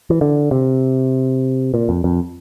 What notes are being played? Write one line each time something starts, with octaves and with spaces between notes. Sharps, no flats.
E3
D3
C3
A#2
F2
F2